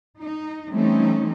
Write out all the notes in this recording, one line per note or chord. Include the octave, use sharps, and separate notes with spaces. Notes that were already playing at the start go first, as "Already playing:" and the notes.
D#4
E3 G3 A3 C4 C#4 D#4